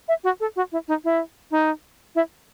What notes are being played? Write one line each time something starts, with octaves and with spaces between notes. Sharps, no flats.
E5
F#4
A4
F#4
E4
D#4
E4
D#4
E4